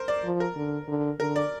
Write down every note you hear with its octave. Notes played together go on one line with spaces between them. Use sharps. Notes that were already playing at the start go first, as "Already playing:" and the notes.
Already playing: A#4 C5
D5
F3
A#4
D3
D3
D3 A#4
D5